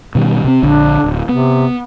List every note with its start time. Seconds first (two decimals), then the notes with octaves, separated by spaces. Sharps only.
0.15 B2 D#3 G3
0.44 C3 A#3 C4
0.63 A#1 D3 D4
1.04 D1
1.29 C3 B3